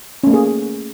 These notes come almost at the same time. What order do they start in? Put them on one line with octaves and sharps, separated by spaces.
C#4 A3 A#3 G#4